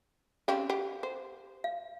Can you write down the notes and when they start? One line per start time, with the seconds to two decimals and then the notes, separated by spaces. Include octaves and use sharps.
0.48 C4 C#4 G4 F5
0.70 G4 F#5
1.03 C5
1.64 F5